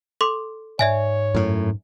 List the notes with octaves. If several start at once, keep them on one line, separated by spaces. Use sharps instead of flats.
A4 C6 D6
G#2 C#5 D5 E5 G#5
F#2 A2